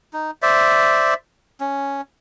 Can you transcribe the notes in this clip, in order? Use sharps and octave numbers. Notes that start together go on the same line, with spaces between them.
D#4
C5 D5 E5
C#4